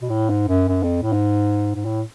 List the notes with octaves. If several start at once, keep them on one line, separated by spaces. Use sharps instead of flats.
B2
A2
G#2
F#2
F#2
F2
A2
G#2
G#2
A2